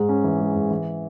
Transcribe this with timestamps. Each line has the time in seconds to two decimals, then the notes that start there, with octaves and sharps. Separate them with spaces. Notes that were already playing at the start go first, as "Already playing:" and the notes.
Already playing: G#2 G#3
0.09 C#4
0.24 E3
0.40 G#3
0.55 G#2
0.71 E3